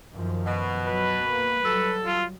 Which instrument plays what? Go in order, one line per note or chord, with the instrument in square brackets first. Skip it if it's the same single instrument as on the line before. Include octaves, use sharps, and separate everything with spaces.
[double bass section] F#2 D#3 F3
[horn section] B2
[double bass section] F#3 [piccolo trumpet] B4
[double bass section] A#3
[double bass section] F#3 G3 [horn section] A4
[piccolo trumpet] F4